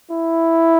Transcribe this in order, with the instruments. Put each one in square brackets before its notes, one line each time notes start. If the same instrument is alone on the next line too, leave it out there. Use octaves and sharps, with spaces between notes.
[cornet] E4